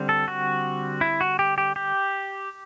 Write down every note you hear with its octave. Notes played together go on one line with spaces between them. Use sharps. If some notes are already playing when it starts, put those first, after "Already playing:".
Already playing: D3 G3 C4
A4
F#4
E4
F#4
G4
G4
G4